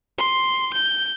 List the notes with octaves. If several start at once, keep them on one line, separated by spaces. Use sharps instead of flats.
C6
G6